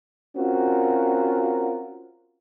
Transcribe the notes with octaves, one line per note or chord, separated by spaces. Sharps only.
C4 C#4 F4 F#4 A#4